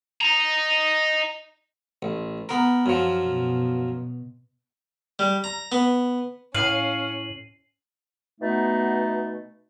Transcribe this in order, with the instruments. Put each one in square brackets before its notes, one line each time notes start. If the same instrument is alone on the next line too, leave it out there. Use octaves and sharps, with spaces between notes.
[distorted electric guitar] D#5 A#5
[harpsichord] A1
B3 A#4
F#2 F3
[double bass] B2
[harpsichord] G3
A#5
B3
[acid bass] A2 [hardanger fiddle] C#4 [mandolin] F5 [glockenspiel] C7 D#7 F#7
[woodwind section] B2 A3 B3 D#4